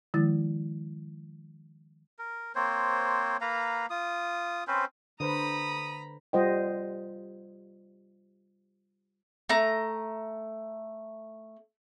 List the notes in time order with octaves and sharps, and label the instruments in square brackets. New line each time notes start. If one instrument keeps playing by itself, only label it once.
[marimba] D#3 F3 G#3 E4 A6
[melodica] A#4
A#3 C4 C5 C#5
A#3 B4 F5 A#5
F4 D#6
C4 C#4 B4 C5
[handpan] D3 B4 C5 [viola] A#5 B5 [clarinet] D#6
[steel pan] G3 F4 C5 D#5 F#5 G5
[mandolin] A3 A#5